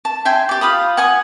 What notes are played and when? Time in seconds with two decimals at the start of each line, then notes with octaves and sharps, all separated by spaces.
0.05 A5
0.25 E5 G5 G#5 C6
0.49 G4 D5
0.61 F4 F5 B5 D#6
0.97 F#5 G#5 D#6